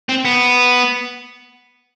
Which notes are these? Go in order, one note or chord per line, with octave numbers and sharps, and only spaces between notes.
C4
B3